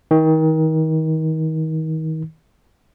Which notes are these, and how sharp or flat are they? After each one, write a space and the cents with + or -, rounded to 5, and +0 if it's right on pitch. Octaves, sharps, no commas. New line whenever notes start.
D#3 +30